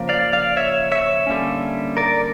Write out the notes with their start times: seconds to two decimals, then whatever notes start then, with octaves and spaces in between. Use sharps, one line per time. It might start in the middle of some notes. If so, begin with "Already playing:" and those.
Already playing: C#3 F3 A#3
0.09 D5 F5
0.33 D5 F5
0.57 C#5 E5
0.91 C#5 E5
1.27 D3 G3 A#3 C#4
1.97 A#4 D5